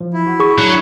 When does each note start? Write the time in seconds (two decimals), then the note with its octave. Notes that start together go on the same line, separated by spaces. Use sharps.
0.01 F3
0.13 E4
0.27 F#4 F#5
0.40 G#4 C#6
0.58 F#3 D4